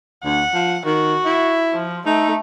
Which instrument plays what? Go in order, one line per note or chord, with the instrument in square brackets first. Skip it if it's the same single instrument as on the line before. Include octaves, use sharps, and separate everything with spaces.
[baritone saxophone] D2 [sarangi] F#5
[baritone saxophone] F3
[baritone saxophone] D#3 [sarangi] F#4
[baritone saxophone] E4
[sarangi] F3
[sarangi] A3 [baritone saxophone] D#4